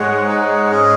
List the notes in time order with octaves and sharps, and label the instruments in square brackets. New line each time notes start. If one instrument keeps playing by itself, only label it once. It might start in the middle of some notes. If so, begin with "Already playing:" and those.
Already playing: [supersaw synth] G#2 G#3 [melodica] C#5 F#5
[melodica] D#4 G#4 C#5 F#5
C#4 G#4 D#5